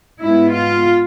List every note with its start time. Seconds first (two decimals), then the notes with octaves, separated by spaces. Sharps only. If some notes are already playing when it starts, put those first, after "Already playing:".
0.22 G#2 G#3 B3 E4
0.54 F4